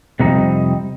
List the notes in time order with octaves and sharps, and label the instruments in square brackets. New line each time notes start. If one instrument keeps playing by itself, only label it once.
[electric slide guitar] F2 C3 G3 C4 D#4